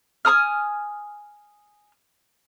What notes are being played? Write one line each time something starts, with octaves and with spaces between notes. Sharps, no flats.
G#5 A#5 D#6 F6